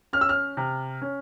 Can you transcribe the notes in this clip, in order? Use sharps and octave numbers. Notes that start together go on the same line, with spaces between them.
C#4 F6
E6
F6
C3
C#4